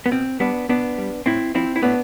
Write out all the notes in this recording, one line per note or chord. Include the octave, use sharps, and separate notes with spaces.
B3
B2 C4
G3 B3 D4
B2 B3 D4
G3
A2 C4 E4
F3 C4 E4
E4
A2 B3 D4